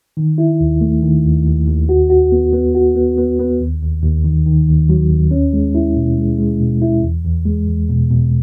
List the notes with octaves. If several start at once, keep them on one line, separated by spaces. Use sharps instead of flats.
D#3
E4
D#2
A3
D#3
D#2
D#2
D#2
F#4
F#4
B3
B3
F#4
B3
B3
B3
D#2
D#2
D#2
D#3
D#3
D#2
F#3
D#2
C#4
G#3
E4
B2
G#3
G#3
B2
E4
E2
E2
G#3
E2
B2
B2